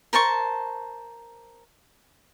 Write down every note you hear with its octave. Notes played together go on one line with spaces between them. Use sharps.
A#4 C5 A5 C#6